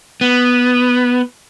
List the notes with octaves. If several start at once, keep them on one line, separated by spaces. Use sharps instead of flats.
B3